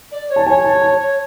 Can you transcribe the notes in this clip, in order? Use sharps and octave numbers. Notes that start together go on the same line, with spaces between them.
D5
C#5
A5
C#5 G#5
A5
A5
C#5